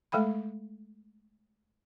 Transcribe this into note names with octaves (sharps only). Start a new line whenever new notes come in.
G#3 A3 A4 G5 B5